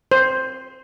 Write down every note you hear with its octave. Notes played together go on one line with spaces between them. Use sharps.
C5